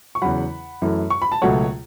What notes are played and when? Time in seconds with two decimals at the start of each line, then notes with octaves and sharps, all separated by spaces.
0.15 C#6
0.22 E2 C#3 F#3 F#5 B5
0.82 F#2 E3 A3
1.10 C#6
1.22 B5
1.32 A5
1.42 C#2 B2 F#3 A3 C#5 F#5